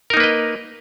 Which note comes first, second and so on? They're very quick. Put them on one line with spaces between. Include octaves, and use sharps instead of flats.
A#4 D#4 A#3 B4 D#5